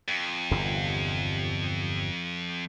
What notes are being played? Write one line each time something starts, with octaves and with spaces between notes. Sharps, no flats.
F2
G1 E2 C3